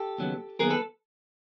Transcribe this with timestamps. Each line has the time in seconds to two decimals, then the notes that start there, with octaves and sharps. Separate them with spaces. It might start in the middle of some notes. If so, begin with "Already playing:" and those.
Already playing: G4 A4
0.18 D#2 C#3 F#3 B3
0.59 D#2 C#3 F#3 B3 G#4 A#4
0.70 A4 B4